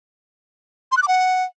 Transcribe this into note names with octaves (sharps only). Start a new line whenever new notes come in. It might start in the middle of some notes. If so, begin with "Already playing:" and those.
C6
F#6
D6
F#5